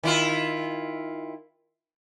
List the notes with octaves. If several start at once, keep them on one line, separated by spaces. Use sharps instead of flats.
D#3 E4 F4